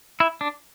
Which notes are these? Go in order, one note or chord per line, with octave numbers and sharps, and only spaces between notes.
E4
D4